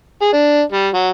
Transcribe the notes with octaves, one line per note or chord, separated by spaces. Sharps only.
G#4
D4
G3
F#3